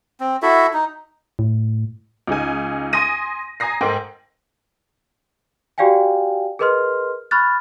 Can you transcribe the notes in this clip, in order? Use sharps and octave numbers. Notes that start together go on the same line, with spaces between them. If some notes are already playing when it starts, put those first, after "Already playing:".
C4
E4 F#4 A4 E5
D#4
A2
C#2 D#4 G#4 G#5
G#5 C6 D#6 A#6 D#7
G#5 A#5 D#6 A#6 C7
G#2 A4 A#4 G5
F#4 G4 D5 F5 G5 G#5
G#4 A#4 B4 D#5 C6 F6
B5 C#6 F6 F#6 A6